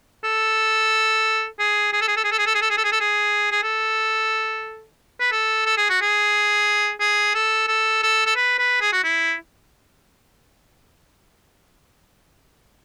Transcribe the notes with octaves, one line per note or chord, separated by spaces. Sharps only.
A4
G#4
G#4
A4
G#4
A4
G#4
A4
G#4
A4
G#4
A4
G#4
A4
G#4
A4
G#4
G#4
A4
B4
A4
A4
G#4
F#4
G#4
G#4
A4
A4
A4
A4
B4
B4
G#4
F#4
E4